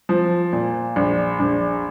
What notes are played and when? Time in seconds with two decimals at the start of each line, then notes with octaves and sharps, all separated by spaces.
0.09 F3
0.52 A#2
0.96 A#1
1.39 A#1